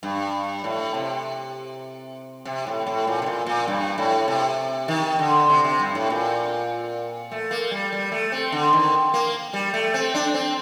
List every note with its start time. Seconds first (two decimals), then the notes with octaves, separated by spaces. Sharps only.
0.03 G2
0.64 A2
0.94 C3
2.45 C3
2.67 A2
2.87 A2
3.07 A#2
3.22 C3
3.26 A#2
3.46 A#2
3.67 G2
3.98 A2
4.28 C3
4.88 D#3
5.19 D3
5.49 C3
5.64 C3
5.80 G2
5.95 A2
6.10 A#2
7.31 A3
7.51 A#3
7.71 G3
7.92 G3
8.12 A3
8.32 C4
8.52 D3
8.73 D#3
9.14 A#3
9.53 G3
9.74 A3
9.94 C4
10.15 D4
10.34 C4